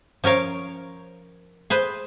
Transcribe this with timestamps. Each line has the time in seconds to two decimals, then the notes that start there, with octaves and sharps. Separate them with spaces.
0.24 F3 C#4 A#4 C#5 F5
1.70 G#4 B4 C5